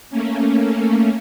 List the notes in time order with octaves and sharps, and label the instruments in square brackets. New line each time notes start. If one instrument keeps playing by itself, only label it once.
[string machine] A3 A#3 C#4